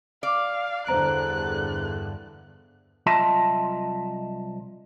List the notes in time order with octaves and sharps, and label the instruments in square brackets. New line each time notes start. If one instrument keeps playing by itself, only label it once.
[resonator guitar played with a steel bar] D5 [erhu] F5
[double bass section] E2 G2 D3 [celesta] C5 A#5 D7 [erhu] F#6
[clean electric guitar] C2 F#3 F4 D#5 E5 A5